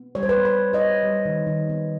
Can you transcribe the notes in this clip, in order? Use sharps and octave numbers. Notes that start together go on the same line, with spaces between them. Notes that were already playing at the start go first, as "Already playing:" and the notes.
Already playing: B3
G3 C#5
C5
B4 C#5
B3
B4 C#5
B3
C#5 D#5
B3
G3
D#3
D#3
B3